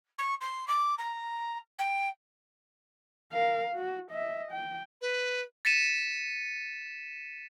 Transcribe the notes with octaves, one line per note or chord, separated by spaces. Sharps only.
C#6
C6
D6
A#5
G5
A#4 F5
F#4
D#5 E5
G5
B4
A6 B6 C#7 D#7 E7